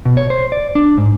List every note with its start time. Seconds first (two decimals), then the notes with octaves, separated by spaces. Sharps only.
0.05 B2
0.17 C#5
0.30 C5
0.52 D5
0.75 D4
0.98 G#2